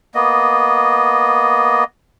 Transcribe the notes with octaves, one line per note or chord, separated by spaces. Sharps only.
A#3 B3 D#5